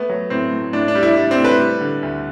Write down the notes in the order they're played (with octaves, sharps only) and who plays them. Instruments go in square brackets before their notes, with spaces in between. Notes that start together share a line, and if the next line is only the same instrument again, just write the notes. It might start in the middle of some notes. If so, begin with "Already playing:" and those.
Already playing: [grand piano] A3 B3
F#3
A2 C4
A2
A2 D4
D4
G3
E4
G3 D4
C4
A2
B4
G3
D3
D2